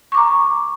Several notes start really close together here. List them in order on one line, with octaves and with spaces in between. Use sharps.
C#6 D6 A#5